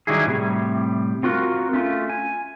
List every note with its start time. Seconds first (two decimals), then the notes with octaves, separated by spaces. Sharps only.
0.07 D#3 F#3 G3 E4 G#4
0.26 A2 C3 G3
1.23 C4 F4 F#4 A#4
1.73 A3 C#4 F4
2.09 G#5